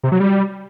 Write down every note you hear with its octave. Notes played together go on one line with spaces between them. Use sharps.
C3
F#3
G3